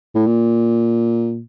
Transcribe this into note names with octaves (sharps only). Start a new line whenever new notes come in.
A2
A#2